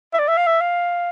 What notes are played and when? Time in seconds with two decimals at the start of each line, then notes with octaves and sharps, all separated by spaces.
0.14 E5
0.19 D5
0.28 E5
0.37 F5
0.47 E5
0.61 F5